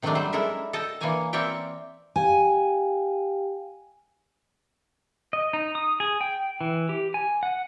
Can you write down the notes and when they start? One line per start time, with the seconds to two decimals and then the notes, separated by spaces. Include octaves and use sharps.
0.02 C3 D#3 F#3 G#3 A3 D4
0.15 F#3 G3 C5
0.33 G#3 E4 A4 A#4 E5
0.73 A4 D#5 G5 A5
1.01 E3 A#3 D4 C#5 G#5 A#5
1.33 C4 A#4 C#5 D5 E5 G5
2.16 G4 F5 G5 G#5
5.33 D#5
5.53 D#4
5.75 D#6
6.00 G#4
6.21 G5
6.61 E3
6.89 G4
7.14 G#5
7.43 F#5